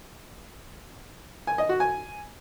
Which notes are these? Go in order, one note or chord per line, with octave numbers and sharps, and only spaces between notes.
G#5
D#5
F#4
G#5